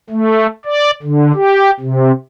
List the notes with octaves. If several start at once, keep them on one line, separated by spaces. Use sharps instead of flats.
A3
D5
D3
G4
C3